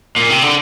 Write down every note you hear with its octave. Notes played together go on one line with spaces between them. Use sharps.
A#2
C3
D3